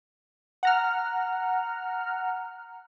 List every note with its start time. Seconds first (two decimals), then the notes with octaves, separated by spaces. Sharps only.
0.63 F#5 A#5 F6